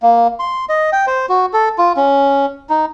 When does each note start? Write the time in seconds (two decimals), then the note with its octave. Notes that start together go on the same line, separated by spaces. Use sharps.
0.03 A#3
0.39 C6
0.69 D#5
0.93 G5
1.07 C5
1.29 F#4
1.53 A4
1.78 F4
1.96 C#4
2.69 D#4